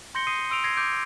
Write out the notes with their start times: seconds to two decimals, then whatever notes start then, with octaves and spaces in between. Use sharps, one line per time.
0.15 C6 G6 A#6 C#7 G7
0.27 D#6 C7 D#7
0.50 C6 E6 D7 F7
0.64 G#6 A#6 C7
0.77 D6 G6 G#6 D7